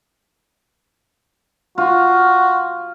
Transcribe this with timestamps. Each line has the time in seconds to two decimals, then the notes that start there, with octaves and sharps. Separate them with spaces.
1.78 F4 F#4